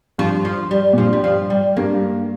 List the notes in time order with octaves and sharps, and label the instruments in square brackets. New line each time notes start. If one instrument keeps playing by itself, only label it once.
[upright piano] G2 [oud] F3
[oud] F3
G3
[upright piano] A#2
[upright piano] G2 [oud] F3
[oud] G3
F3
G3
[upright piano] G2 [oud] A#3